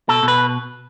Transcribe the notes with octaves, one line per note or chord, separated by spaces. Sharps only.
B2 A4
B2
B4